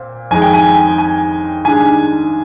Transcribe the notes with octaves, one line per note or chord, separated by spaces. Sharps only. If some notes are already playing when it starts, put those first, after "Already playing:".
Already playing: A#2 C4
F2 D#3 G#3 G#5
G5
G#5
G#5
G2 D#3 G#3 D4 G#5